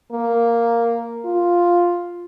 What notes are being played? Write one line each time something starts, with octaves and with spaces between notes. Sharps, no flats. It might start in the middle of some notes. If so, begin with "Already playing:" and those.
A#3
F4